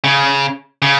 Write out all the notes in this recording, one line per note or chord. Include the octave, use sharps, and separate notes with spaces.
C#3
C#3